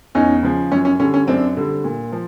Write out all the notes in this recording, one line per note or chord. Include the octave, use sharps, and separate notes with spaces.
E2 C#4 D#4
C#3 F3
F#2 C#4
C#4
D3 G3 C#4
C#4
F#2 C4 D4
D3 G3
A#2
F3